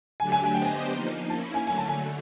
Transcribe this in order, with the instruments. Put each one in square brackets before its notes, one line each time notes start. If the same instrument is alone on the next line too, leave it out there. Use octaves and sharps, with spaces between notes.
[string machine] D3 F#3 A3 D4 G4 [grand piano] G#5
[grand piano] G#5
G#5
[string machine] B3 D4 G4 C5 D#5 [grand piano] G5
[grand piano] G#5
[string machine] F3 A#3 D#4
[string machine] A#3 C#4 E4 [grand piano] A5
[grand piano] G#5
[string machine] D3 F#3 A3 [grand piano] G#5
[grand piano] A5
G#5